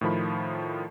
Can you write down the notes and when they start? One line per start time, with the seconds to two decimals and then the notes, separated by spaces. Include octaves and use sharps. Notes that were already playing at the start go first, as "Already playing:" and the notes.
0.01 A2 D#3 F3 B5